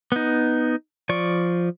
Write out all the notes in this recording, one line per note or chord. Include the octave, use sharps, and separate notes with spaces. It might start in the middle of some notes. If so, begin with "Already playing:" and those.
B3 D#4
F3 D5 C#6